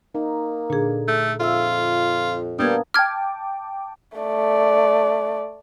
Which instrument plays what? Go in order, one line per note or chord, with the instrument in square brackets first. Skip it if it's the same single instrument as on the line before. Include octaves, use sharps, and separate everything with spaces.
[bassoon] A#3 [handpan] D#4
[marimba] A#2 G#4 [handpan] D3
[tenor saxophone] A3
[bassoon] F2 [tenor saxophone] F4 [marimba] E5 F5 E6
[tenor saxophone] G3 [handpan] A#3 B3 D4 [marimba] D#6 G#6
[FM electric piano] G5 A5 D6 [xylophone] F6 G#6
[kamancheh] A3 D5